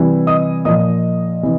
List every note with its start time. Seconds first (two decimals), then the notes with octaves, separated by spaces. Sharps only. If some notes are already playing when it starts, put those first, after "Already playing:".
Already playing: C3 E3 G3
0.27 D#5 D#6
0.65 A#2 F3 D#5 D#6
1.43 C3 E3